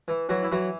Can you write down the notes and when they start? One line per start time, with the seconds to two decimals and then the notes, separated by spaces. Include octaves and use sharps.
0.08 E3
0.29 E3 F#3 F#4
0.43 E4
0.52 E3 F#3 F#4